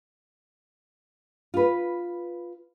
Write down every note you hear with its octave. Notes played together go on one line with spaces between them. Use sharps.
F4 B4